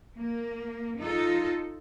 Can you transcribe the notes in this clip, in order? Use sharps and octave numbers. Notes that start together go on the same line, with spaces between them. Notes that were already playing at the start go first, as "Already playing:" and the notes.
A#3
D#4 F4 A4